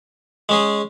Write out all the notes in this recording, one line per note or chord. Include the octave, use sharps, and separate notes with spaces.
G#3 C#4 G#4